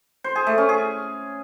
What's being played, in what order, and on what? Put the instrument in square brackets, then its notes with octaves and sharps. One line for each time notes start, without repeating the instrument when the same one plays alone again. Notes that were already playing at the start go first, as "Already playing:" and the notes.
[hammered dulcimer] C5
G#4
A3
C#4
G#4